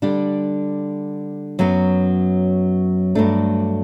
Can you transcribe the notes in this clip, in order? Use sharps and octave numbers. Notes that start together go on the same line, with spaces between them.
D3 G3 D4 G4
F#2 F#3 B3
G2 F#3 A3 D4